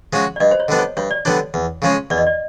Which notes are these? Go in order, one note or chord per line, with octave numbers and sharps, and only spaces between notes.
F3 G#3 C#4 F#4
D5
G2 D#5
C5
C#5
D3 G3 B3 D4
C#5
G2 C#5
D5
D3 G3 B3 D4 C#5
E2
C#3 F3 G#3 C#4
E2 D5
D#5
D5